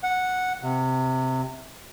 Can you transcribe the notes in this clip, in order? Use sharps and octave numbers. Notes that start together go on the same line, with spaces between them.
F#5
C3